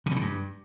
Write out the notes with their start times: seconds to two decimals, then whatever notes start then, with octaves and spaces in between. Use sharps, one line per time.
0.06 C3
0.11 A2
0.16 C#3
0.21 G2